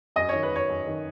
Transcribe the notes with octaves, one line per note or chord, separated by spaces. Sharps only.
F#2 D#5
D#3 C#5
B4
F#2 C#5
F#2
D#3